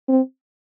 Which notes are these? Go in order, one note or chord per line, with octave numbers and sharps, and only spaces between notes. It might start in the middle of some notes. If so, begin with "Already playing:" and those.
C4